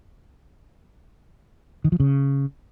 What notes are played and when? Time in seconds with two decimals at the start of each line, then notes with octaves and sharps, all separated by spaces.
1.84 D#3
1.92 F3
2.00 C#3